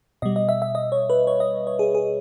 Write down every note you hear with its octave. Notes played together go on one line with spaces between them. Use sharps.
B2 G3 D#5
D#5
E5
E5
D#5
C#5
B4
C#5
D#5
C#5
G#4
G#4